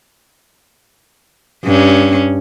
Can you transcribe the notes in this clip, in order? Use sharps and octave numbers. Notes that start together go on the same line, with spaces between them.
G2 C#4